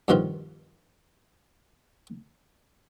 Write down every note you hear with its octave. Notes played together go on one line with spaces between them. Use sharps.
G2 B2 D#3 F3 F4